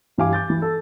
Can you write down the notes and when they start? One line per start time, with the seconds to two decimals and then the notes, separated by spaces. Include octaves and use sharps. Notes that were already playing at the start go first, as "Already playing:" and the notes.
0.18 G2 E3 G4 F5 G#5 D6
0.33 D6 G6 A6
0.50 E3
0.62 A4